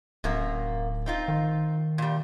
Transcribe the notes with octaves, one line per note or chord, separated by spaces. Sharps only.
D1 F#2 A#2 A#3
C4 D#4 F4
D#3
A#2 G3